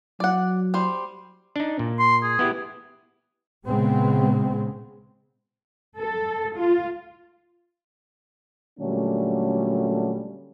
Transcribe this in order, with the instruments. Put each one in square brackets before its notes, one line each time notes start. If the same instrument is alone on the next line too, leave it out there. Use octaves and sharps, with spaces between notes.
[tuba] F#3 [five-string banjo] D5 F#5
[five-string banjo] G3 C5
[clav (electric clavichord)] D4 D#4
A#2
[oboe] C6
G#4
[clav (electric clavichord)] B3 E4 G4
[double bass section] A#2 C#3 G#3 B3 C4
[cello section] A4
F4
[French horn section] A#2 D3 F#3 G3 A3 C#4